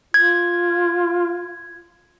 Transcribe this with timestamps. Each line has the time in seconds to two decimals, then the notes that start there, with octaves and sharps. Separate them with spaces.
0.14 F4 G#6